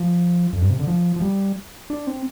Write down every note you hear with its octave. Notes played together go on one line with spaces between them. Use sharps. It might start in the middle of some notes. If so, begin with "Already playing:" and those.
Already playing: F3
F2
G2
C3
D3
F3
F3
G3
D4
C4